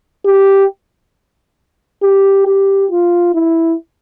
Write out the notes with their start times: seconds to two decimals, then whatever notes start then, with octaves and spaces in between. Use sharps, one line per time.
0.26 G4
2.03 G4
2.47 G4
2.91 F4
3.35 E4